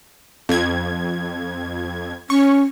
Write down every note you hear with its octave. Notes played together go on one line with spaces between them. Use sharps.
F2 G#6
C#4 C#6